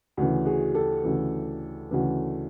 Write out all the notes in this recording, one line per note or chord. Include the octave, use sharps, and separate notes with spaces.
D2 C#3 E3
F#4 G#4
G4 A4
D2 C#3 E3
D2 C#3 E3